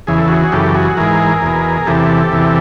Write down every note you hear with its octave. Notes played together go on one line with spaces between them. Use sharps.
E2 C#3 E3 G#4
A4
F#4 G#4
F#2 C#3 E3 G4 A4
F#4 G#4
G#2 E3 G#4 A#4
E2 B2
E2 C3 E3 G4 A4
E2 C3 E3